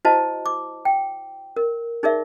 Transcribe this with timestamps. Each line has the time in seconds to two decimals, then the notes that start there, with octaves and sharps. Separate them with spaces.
0.05 E4 F#4 C5 D#5 A5
0.46 D6
0.85 G5
1.57 A#4
2.03 D#4 G#4 A#4 D5 E5